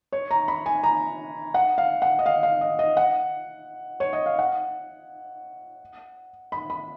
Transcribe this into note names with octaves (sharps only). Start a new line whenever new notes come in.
C#5
A#5
B5
G#5
A#5
F#5
F5
F#5
D#5
F5
F5
D#5
D#5
F#5
C#5
D#5
F5
F#5
B5
B5